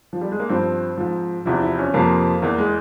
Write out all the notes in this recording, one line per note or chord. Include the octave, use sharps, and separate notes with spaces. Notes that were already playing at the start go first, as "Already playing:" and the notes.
F3
G3
G#3
A#3
G2 F3 C4
G#2 F3
E2 C3 F3 E4
E4
C#4
F2 C3 F3 A#3
E2 E3 A#3
G#3